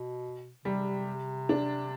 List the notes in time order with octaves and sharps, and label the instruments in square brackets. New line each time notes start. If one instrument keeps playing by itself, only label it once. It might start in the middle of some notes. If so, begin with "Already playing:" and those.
Already playing: [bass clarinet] B2
[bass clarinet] C3 [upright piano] G3
[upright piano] D4